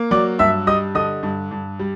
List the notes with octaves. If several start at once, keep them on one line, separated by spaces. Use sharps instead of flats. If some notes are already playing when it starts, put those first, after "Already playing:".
Already playing: A#3
F#3 D5 D6
G2 E5 E6
G3 D#5 D#6
D3 D#5 D#6
G2
G2
G3